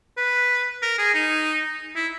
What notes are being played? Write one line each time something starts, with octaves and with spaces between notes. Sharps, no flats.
B4
A#4
G#4
D#4
E4